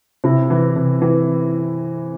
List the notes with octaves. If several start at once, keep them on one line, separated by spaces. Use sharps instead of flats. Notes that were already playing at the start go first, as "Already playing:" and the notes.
C3 E4
E3
C3
E3